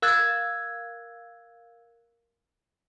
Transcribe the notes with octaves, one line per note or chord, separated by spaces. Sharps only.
A#4 F5 E6 F#6 G#6 A6